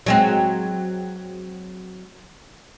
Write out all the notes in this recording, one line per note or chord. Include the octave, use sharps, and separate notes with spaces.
F#3 G#3 C4